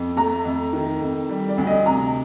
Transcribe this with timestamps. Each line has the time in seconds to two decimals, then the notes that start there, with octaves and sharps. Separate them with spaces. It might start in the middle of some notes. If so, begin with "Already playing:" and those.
Already playing: F2
0.16 A3 A#5
0.45 F2
0.73 D#3
1.02 F2
1.29 G3
1.49 D5
1.58 D2
1.67 D#5
1.86 C3 A#5